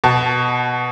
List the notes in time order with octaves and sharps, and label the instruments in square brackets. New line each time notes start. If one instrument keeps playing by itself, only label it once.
[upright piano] B2 A5